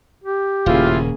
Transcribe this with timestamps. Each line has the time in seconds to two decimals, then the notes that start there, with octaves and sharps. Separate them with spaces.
0.24 G4
0.66 D#1 A2 C#3 A#3 E4 F4 G#4